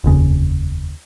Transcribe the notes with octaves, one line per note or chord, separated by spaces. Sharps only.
F1 D#2 C#3